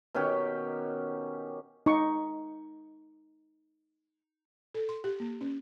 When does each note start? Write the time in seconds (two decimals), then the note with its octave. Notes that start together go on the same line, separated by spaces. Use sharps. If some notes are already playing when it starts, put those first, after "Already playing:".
0.15 B2 D#3 C#4 G4
1.86 D#4 C#6
4.74 A4
4.89 C6
5.04 G4
5.20 A#3
5.41 C#4